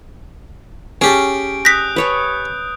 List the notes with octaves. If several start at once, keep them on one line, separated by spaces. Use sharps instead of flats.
C#4 G4 G#4 A5 D7
D#6 F#6 G6 A#6 B6
B4 C#5 A5